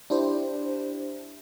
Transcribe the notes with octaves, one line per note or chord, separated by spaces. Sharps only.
D4 E4 G4 C5